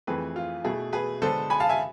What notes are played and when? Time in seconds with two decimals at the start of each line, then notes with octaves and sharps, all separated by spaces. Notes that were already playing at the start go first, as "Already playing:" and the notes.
0.07 F2 E3 A3 C4 G#4 B4
0.36 F4
0.64 B2 A3 E4 G#4
0.93 G#4 B4
1.22 D3 G#3 B3 A4 C5
1.50 G#5 B5
1.60 F5 A5
1.69 E5 G#5